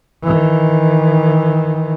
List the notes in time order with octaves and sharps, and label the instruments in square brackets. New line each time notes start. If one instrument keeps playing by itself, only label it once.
[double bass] D#3 E3